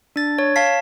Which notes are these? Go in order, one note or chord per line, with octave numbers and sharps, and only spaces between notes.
D4 A6
C#5
F5 A5 B6